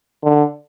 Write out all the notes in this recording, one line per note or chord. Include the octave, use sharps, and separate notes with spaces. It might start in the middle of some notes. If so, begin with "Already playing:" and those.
D3